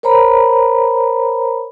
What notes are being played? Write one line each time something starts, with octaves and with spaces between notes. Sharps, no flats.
A#4 C5 C#5 A#5 B5